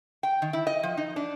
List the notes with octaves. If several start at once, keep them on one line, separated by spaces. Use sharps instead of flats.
G5
D#3
E4
D#5
F3
D#4
D4